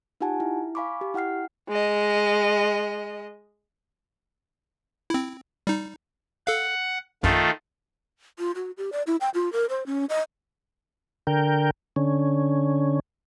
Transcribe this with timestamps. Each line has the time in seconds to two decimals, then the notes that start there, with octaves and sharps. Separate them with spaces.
0.21 D#4 F4 G4 F#5 G#5 A5
0.40 E4
0.75 F5 G#5 B5 C#6 D6
1.01 G4
1.14 E4 F#5 G5 F6 C7
1.69 G#3 D#5
5.10 C4 E4
5.67 G3 D#4
6.47 A4 F5 F#5
7.23 A#1 F#2 D#3 A3 F4
8.39 F4
8.55 F#4
8.78 G4
8.92 D5
9.07 E4
9.21 G5
9.34 F4
9.53 A#4
9.69 C5
9.86 C#4
10.09 D#5
11.27 D3 A#4 G5
11.96 D3 C#4